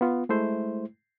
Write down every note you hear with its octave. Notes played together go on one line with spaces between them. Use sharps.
B3 F4
G#3 A3 E4 C5